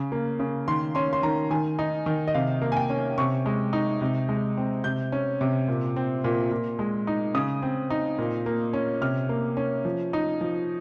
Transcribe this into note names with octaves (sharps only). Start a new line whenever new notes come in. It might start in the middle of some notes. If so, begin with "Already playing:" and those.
Already playing: C#3
A#3
C#3
D#3 C6
C#4 C6
C6
D#3 A#5
D#3 G#5
D#4
D#3
D#5
C3 F5
A#3
G#5
G5
C#4
C3 C#6
G#3
D#4
C3
G#3
C4
C3 G6
C#4
C3
A#2
C4
A#2
A#2
G#3
D#4
C#3 D#6
C4
D#4
A#2
A#3
C#4
C3 F6
A#3
C#4
F3
D#4
F3